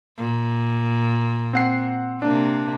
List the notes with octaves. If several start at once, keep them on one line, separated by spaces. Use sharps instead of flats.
A#2
C4 F#5 C7
C3 A#3 D4